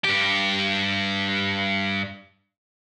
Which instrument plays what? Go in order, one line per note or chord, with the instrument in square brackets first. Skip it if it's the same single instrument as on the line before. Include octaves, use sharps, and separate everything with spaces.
[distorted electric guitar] G2 G4